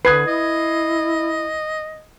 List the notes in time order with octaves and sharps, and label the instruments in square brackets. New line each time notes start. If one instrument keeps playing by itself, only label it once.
[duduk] D3 [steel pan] B4 [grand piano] D#6 G#6 C7
[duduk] E4 [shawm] D#5